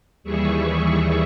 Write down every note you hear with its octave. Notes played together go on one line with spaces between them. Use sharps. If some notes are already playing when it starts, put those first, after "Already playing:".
D#2 E3 G3 G#4 E5 C#6